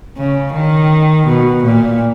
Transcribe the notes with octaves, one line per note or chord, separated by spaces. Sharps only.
C#3
D#3
B2
A#2